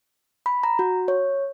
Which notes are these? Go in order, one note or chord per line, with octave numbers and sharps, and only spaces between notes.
B5
A#5
F#4
C#5